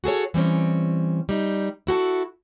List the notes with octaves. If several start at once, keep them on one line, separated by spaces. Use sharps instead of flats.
F#4 G#4 A4 C#5
E3 G3 C4 C#4
G3 D#4
E4 F#4 G4 A4